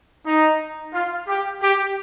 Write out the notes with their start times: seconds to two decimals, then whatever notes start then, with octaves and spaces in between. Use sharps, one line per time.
0.25 D#4
0.93 F4
1.27 G4
1.61 G4